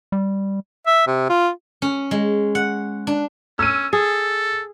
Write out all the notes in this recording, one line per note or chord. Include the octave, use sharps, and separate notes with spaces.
G3
E5
C3
F4
C#4
G#3
F#5
D4
C#4 E6 D#7
G#4 A4